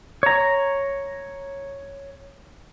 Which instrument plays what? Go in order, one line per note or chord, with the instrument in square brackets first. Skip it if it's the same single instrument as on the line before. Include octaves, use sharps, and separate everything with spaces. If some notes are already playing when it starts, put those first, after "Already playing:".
[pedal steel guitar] C#5 A#5